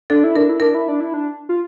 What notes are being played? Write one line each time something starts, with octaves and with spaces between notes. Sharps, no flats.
D4 A4
E4
D4 A#4
E4
D4 A#4
E4
D4
E4
D4
F4